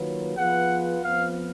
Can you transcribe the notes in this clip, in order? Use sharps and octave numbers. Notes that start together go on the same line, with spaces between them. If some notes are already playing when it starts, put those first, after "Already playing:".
Already playing: D#3 F#3 A#3 F4 B4
F3 B3 F4 G#4 B4 F#5
F2 F3 B3 F5